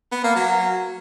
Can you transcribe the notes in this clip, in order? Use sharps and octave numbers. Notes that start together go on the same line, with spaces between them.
B3
A#3
F#3